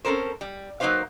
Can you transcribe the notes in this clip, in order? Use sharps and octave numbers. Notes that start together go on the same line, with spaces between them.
C4 C#4 A4 A#4 C5
G3
F#3 A#3 D#4 B4 C5 F5